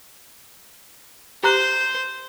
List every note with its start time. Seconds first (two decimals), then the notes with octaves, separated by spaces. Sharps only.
1.43 G4 C5 A#5 F#6